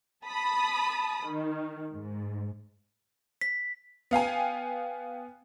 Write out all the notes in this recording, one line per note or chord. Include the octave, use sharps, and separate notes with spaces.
A5 B5 D#6
D#3
G#2
B6
B3 F5 G5 G#5